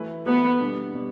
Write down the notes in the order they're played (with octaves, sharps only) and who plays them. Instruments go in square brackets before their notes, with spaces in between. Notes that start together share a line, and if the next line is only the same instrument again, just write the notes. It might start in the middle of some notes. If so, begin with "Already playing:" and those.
Already playing: [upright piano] E3 A3 E4 B4
[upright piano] E3 A3 E4 B4 [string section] B3
[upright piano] B2 G3 D4
B2 G3